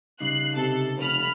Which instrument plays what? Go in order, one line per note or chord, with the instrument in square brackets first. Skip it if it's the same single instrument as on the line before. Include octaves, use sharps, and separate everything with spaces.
[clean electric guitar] C#3 G3 D#4 [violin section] F#6 C7
[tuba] C3 [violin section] A4
[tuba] F1 [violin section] B5 F6